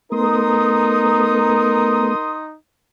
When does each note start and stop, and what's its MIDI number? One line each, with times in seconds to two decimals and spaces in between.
0.12 2.15 57
0.12 2.15 59
0.12 2.57 63
0.12 2.37 70
0.12 2.45 84
0.12 2.45 87